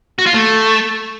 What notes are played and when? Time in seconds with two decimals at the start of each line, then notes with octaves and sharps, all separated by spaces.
0.19 F#4
0.26 F4
0.34 A3